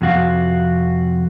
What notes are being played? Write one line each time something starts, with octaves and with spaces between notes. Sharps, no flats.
F2 C3 F#4 F5